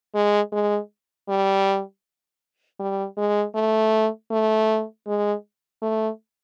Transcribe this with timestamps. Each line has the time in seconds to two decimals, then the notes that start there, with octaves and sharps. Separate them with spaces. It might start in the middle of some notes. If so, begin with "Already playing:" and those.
0.15 G#3
0.52 G#3
1.28 G3
2.79 G3
3.17 G#3
3.55 A3
4.31 A3
5.07 G#3
5.82 A3